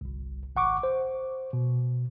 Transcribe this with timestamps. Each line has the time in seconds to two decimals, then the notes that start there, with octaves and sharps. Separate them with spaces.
0.01 G1 C2
0.56 G#1 F#5 C#6 D6
0.83 C5
1.53 B2